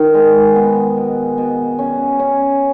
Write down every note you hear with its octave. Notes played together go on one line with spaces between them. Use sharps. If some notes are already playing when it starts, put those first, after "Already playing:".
Already playing: D#3
G#3
B3
B2
B2
C#4
C#4